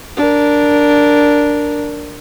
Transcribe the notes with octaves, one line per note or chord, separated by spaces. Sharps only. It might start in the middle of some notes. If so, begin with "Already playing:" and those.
D4 A#4